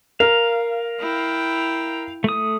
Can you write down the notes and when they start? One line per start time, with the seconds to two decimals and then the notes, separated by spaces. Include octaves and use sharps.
0.20 A#4 F5
1.00 E4 G5
2.24 A3 D#6